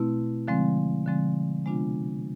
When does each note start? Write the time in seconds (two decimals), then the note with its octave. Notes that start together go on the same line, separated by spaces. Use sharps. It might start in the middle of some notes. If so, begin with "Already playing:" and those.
Already playing: B2 A3 C4 E4
0.48 D3 F3 G#3 C4
1.06 D3 F3 G#3 C4
1.66 C3 G#3 B3 D4 F4